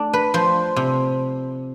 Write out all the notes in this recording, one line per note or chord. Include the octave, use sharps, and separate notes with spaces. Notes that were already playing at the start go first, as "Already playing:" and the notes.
Already playing: A3 D4
B4
F3 C5
C3